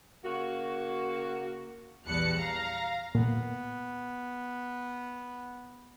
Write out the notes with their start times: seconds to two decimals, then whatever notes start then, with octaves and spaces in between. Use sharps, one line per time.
0.25 C#3 A#3 F#4
2.06 A#1 E2 G3 A5 F#6 C#7
2.37 F5 A#5 A#6
3.15 A#2 B3